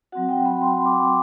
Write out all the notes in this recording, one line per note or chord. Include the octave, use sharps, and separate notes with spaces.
F#3 C4 F#4 F#5
G5
B5
C6
D6